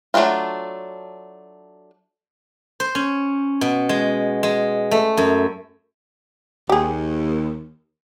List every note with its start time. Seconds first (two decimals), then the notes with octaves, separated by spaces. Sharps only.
0.14 F#3 A3 D4 D#4 F4
2.80 C5
2.95 C#4
3.61 B2
3.89 G#3
4.43 G#3
4.91 A3
5.17 F#2
6.69 D#2 G4 G#4